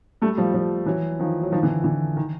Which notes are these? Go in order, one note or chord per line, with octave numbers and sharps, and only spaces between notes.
G3 A3
F3 G3
F3 G3
E3 F#3
D#3 F3
F#3
D#3 F3
D3 E3
D3 E3
D#3